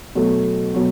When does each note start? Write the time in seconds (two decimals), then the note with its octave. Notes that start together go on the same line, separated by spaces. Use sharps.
0.15 B2 F#3 A3
0.74 B2 F#3